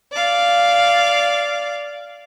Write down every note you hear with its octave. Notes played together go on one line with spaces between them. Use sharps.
D5 F5